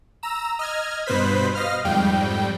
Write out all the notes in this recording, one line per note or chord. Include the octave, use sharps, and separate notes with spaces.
A#5 E6
D#5 F6 G#6
G2 B2 B4 C5 B6
D#5 F5 F6
F2 G#2 G3 G5